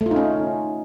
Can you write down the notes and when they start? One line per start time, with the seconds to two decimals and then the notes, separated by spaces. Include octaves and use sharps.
0.01 A3
0.06 F4
0.11 D#4
0.16 C#4